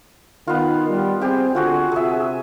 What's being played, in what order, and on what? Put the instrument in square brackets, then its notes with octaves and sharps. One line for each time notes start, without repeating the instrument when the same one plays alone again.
[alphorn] D#3 [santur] B3 F4
[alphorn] G3
[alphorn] C4 [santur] G4 G#4
[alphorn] D3 [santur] F4 F#4 G#4
[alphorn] C3 [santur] G#4 E5